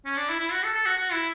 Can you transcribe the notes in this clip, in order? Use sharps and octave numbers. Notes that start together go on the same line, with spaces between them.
C#4
D4
E4
E4
F#4
A4
A4
F#4
F#4
E4